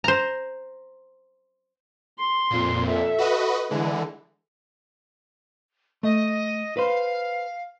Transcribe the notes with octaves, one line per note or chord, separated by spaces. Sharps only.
C5 A#5
C6
F2 A#2
A4 E5
F#4 B4 D#5
D3 E3 G#3
A3 D#5
B4 C5 F5